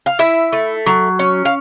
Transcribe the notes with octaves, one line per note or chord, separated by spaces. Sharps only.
F5
E4 E5
A3
F#3
C#4
F5